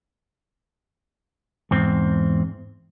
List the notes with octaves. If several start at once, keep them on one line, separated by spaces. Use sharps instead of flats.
E2 G#2 C4